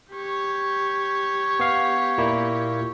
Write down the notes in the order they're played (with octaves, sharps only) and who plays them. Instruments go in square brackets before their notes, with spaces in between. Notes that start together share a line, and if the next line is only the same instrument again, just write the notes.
[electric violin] G4 C#5
[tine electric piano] B3 F5
A#2 A#3 E4